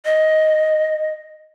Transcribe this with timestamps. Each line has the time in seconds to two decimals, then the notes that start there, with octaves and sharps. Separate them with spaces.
0.05 D#5